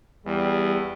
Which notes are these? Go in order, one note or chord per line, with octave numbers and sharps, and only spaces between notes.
E2 G3